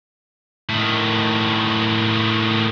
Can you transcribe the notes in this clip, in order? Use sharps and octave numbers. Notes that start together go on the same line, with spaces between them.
A2 D#3